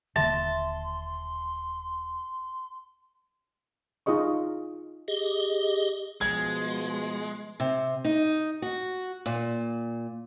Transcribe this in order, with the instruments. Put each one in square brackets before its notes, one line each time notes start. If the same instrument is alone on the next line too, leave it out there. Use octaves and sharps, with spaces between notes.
[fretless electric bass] D#1 D3 A#3 [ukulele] E5 [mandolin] A5 [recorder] C6
[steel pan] D#4 F4 G#4 D#5 C#6
[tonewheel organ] G4 G#4 D#5
[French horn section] B2 F3 [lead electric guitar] G#3 [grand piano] G#6
[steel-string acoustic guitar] C3
D#4
F#4
A#2